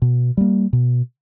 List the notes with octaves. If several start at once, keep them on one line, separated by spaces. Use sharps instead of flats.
B2
G3 A#3
B2